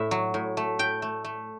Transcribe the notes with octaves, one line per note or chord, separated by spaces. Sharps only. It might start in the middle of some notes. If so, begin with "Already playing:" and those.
Already playing: A2 E5
F#3
A2
A3
A2 G5
A3
A3